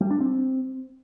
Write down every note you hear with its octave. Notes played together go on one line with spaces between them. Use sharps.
G3
D4
C4